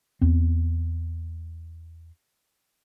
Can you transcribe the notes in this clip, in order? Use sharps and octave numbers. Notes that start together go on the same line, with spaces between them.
E2 C4